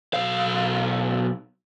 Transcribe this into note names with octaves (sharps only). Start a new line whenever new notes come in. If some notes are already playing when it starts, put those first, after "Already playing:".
B1 F5